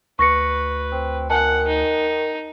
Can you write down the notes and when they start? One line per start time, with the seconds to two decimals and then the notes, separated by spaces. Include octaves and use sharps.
0.19 D2 B4 C#6 A#6 C#7
0.92 C4
1.30 D#3 F#5 G#5 A5
1.67 D#4